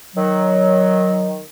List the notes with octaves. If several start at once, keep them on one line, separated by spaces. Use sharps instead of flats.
D#3 F#3